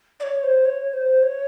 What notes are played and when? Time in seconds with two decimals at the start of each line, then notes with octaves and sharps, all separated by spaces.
0.20 D5
0.23 C#5
0.43 C5
0.65 C#5
0.89 C#5
0.93 C5
1.23 C#5